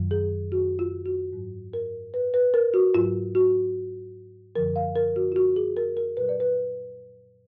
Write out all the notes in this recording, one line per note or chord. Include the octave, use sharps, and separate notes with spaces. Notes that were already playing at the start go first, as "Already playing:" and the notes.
Already playing: F#2 D#3 F#3
G#4
F#4
F4
F#4
G#2 F#3
A#4
B4
B4
A#4
F#4
G#2 F#3 F4
F#4
F#2 D3 F3 A#4
F5
A#4
F#4
F4
F#4
G#4
A#4
A#4
A#2 F#3 B4
D5
B4